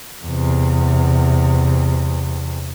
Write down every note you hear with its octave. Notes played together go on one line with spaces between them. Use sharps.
E2 C3